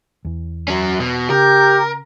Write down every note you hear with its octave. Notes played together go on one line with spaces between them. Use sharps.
E2 E3
F#3 C#4
B2
C#3 G4 A#4